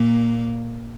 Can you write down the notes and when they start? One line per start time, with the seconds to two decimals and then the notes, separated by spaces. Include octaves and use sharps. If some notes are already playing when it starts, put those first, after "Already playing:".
Already playing: A#2 A#3